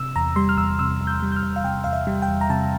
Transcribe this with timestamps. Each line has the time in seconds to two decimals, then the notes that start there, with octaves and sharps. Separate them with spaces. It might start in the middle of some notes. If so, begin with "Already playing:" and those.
Already playing: C3 E6
0.16 E2 A#5
0.36 G3 C6
0.49 F6
0.58 E2 E6
0.79 C3 E6
1.01 E2
1.07 G6
1.22 G3
1.32 G6
1.36 F6
1.43 E2
1.56 F5
1.64 C3 G5
1.84 E2 F5
1.93 E5
2.07 G3
2.22 G5
2.28 E2
2.41 A#5
2.50 C3 A5